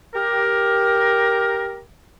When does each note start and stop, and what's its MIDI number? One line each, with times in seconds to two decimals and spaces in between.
0.15 1.81 67
0.15 1.81 70